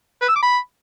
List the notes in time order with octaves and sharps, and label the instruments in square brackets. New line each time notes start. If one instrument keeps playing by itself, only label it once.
[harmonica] B4
E6
D6
B5